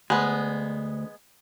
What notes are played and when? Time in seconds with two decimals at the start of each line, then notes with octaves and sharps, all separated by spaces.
0.10 D2 G#3 B3